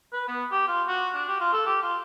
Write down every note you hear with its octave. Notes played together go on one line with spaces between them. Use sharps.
B4
B3
G4
F4
F#4
D4
G4
F4
A4
G4
F4